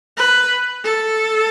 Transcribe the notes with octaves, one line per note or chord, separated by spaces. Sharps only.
B4
A4